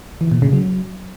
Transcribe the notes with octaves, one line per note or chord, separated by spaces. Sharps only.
E3
A#2
C#3
F#3